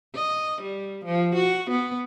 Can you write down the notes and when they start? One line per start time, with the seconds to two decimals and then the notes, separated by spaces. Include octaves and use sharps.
0.16 D#5
0.62 G3
1.05 F3
1.36 F#4
1.71 B3